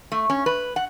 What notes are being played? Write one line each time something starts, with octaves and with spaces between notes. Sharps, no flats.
A3
C#4
B4
F#5